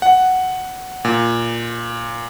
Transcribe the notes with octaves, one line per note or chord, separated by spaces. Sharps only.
F#5
A#2